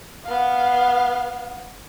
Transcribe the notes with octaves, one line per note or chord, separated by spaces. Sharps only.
B3 F5